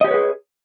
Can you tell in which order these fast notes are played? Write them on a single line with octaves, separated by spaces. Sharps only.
D#5 G4 C#5 B4 G#4